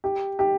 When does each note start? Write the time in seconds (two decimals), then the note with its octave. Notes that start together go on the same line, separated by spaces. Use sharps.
0.04 G4
0.39 G4